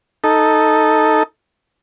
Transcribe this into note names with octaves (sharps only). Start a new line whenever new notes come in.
D#4 A4